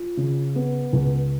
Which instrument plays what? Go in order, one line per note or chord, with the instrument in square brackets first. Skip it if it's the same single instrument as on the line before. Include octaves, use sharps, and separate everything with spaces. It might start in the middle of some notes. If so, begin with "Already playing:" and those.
Already playing: [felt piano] F3
C#3
B3
C#2